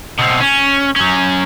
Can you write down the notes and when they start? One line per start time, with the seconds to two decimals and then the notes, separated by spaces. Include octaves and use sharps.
0.19 B2 C4
0.41 C#4
0.96 F#3 C#4